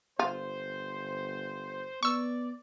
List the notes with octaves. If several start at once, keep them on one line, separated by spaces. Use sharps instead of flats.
G1 F4 C5
B3 D5 C#6 E6